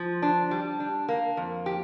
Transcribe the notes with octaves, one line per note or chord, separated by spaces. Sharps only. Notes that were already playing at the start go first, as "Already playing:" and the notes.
Already playing: F3
D4
G3
D4
A#3
F2
G4